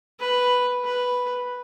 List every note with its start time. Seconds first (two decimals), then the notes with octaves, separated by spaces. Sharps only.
0.20 B4
0.84 B4